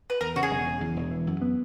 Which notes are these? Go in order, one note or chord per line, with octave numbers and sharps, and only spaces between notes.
B4
E2 A#4
C#3 F#4
G#4
E1
C#3
E2
E1
E3
F#2
B3